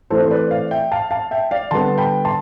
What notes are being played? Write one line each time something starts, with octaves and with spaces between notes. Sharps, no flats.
E3 A3 C4 A4 C5
C5
B4 D5
D5 F5
E5 G5
F5 A5
F5 A5
E5 G5
D5 F5
D3 G3 B3 A5 C6
G5 B5
A5 C6